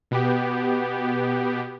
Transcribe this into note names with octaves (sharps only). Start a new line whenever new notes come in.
B2 B3 G4